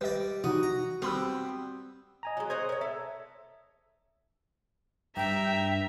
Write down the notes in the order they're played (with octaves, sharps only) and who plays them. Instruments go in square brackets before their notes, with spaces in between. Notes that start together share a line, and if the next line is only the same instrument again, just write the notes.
[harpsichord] G3 D5 [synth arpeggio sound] B4 D#5
[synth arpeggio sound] C3 E3 D#4 [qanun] F#4 [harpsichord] D#5
[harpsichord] A#5
[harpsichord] G3 B3 [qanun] C4 [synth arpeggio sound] G4 B5 E6
[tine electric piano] D#5 G#5 A#5
[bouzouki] F#3 G#3
[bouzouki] C5 C#5 F#5 [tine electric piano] A#5 D#6 G#6
[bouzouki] A#4 C#5
[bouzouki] A4 [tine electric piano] E5
[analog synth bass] G2 [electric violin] E5 [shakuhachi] G5 [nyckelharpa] A#5